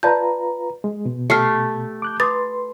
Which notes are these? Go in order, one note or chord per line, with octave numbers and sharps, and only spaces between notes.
F4 B4 D5 A5 A#5 G6
G#3
B2
A3 G4 F6 C7 C#7
D6 F#6 G6
B4 C6 D6 D#6 A6